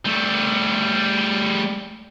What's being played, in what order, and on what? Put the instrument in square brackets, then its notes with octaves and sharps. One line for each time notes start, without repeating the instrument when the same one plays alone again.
[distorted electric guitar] G3 A3